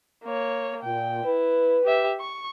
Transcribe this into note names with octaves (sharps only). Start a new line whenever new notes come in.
A#3 C#5
A#2 G5
E4 B4
G4 E5
C#6